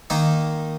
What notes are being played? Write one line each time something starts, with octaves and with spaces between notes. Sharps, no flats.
D#3 A#3 D#4